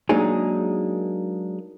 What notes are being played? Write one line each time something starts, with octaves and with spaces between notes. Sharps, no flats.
F#3 G#3 A#3 D4 D#4 G#4